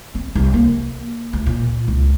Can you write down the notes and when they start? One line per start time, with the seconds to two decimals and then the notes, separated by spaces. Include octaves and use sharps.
0.15 C4
0.35 C2
0.53 A#3
1.33 D2
1.46 A#2
1.88 C#2